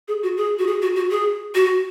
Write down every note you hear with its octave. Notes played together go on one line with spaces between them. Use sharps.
G#4
F#4
G#4
F#4
G#4
F#4
F#4
G#4
F#4